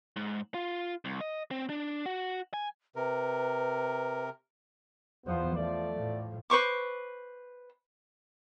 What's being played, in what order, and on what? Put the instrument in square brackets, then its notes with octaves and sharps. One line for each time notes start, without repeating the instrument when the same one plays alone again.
[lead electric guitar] G#2
F4
C2
D#5
C4
D4
F#4
G#5
[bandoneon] C3 A#4 [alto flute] B4
[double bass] E2 F3 [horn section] B3 C5
[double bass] F3 [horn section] A3 D5
[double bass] A2 F3
[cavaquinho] B4 C5 C#6 D6